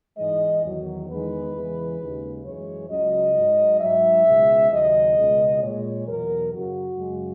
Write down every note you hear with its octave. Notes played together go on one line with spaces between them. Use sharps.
G#2 E3 G#3 D#5
E2 D#3 F#3
E2 D#3 G#3 B4
E2 C#3 E3 G#3
D#2 C#3 G#3
F#2 E3 G#3 C#5
C#2 C#3 F#3 D#5
G#2 F#3
G#2 F#3 E5
C#2 B2 G#3
D#2 C#3 F#3 D#5
C#2 B2 G#3
A#2 G#3 C#5
E2 B2 F#3 A#4
F#2 C#3 F#3 F#4
F#2 C#3 G#3